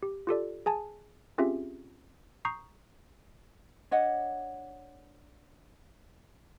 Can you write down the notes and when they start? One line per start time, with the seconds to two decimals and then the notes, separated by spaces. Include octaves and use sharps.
0.03 G4
0.27 F4 G4 A4 D5
0.66 G#4 G#5 A5
1.38 C4 C#4 F4 G4 G#4 E5
2.45 A#5 C#6 D#6 G6 C7
3.91 D4 C#5 D#5 F#5